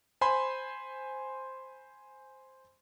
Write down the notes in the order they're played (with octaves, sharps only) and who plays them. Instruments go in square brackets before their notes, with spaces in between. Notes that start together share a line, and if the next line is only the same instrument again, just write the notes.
[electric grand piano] C5 G#5 B5 C6